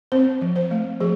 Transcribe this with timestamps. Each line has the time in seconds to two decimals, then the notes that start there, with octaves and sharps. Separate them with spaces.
0.12 C4 C5
0.42 F3
0.56 C5
0.71 A3
1.00 F3 G#4